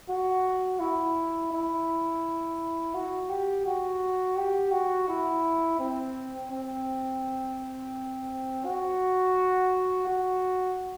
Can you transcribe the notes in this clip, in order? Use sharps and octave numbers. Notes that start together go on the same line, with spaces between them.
F#4
E4
E4
F#4
G4
F#4
G4
F#4
E4
C4
C4
F#4
F#4